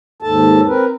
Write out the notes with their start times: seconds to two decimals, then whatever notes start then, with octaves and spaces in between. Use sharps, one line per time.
0.22 D#2 G#2 A4 A5
0.67 C4 A#4 B4